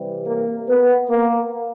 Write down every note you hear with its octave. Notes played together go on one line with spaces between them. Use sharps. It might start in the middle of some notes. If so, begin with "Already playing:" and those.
Already playing: C3 E3 G3
A#3
B3
A#3